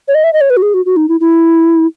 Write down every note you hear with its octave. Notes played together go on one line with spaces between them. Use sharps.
C#5
D#5
E5
D#5
C#5
B4
F#4
G#4
F#4
F#4
D#4
E4
E4